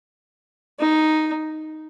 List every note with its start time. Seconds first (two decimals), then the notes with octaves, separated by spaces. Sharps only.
0.80 D#4